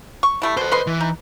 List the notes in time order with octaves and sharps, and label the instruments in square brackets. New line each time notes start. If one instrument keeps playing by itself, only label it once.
[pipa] C#6
G3 A3 E4
[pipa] B2 [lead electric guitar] A4 C5
[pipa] B4 D#5 C6
[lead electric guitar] E3
[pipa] D#4